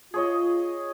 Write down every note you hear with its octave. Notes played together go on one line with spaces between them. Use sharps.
F4 G#4 C#5 D#5